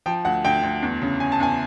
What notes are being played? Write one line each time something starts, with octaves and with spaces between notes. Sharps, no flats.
F3 G5
D2 F#5
D2 G5
D2
E2
C#3
C#3 G#5
A5
E2 G#5